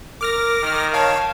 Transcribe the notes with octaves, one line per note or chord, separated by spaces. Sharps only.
A#4 D6 F6 A#6
D#3
C#5 F5 A5